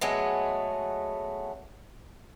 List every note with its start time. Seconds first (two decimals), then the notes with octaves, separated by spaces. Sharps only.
0.01 F#3 G#3 A3 B3